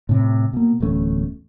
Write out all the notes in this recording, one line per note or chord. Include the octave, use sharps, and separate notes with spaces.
A2 C3
B2 A#3
D1 E2 A3 C#4